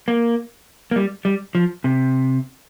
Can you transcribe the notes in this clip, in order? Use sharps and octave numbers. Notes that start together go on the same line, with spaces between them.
A#3
A#3
G3
G3
F3
C3